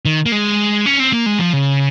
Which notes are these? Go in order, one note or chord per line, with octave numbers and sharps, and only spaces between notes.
D#3
A#3
G#3
C#4
C4
A#3
G#3
F3
C#3